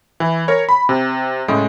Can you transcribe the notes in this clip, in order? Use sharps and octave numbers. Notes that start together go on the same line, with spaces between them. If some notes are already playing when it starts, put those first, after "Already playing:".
E3
A#4 C#5
B5
C3
A2 C#3 G#3